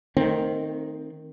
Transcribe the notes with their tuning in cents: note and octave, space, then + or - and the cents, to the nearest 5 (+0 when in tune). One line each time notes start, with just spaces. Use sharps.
D#3 +0 A3 +40 C4 +10